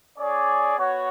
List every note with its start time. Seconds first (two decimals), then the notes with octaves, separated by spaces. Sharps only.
0.18 C#4 G#4 D5
0.77 B3 F#4 C#5